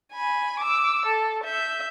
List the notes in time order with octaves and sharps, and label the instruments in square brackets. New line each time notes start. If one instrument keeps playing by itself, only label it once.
[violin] G#5 B5
D6 E6
A4
E5 G6